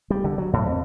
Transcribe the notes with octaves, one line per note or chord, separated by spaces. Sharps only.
G3
D3
F#3
A2
F2